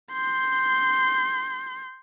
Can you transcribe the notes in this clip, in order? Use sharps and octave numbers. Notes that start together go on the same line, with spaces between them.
C6 G6